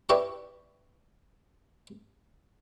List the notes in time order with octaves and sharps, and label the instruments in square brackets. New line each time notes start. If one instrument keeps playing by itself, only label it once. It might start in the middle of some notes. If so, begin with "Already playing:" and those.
[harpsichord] D4 E4 G4 B4 B5 C#6